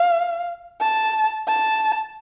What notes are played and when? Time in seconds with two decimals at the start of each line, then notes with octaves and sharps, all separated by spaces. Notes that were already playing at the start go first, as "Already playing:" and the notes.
Already playing: F5
0.82 A5
1.48 A5